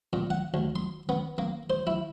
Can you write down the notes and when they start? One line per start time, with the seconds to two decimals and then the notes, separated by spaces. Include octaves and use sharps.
0.13 A#2
0.30 F#5
0.54 D2
0.76 C6
1.09 B3
1.38 A#3
1.70 C5
1.87 E4